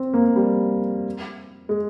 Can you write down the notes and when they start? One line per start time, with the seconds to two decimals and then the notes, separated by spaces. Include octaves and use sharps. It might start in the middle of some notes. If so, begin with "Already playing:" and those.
Already playing: C4
0.14 A#3
0.36 G3
1.69 G#3